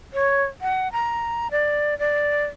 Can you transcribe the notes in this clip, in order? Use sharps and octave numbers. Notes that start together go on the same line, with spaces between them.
C#5
F#5
A#5
D5
D5